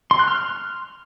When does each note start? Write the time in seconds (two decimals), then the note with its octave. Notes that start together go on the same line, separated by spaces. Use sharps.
0.11 C6
0.19 F#6
0.28 F6